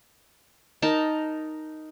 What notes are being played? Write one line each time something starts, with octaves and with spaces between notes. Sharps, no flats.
D#4 A#4 A5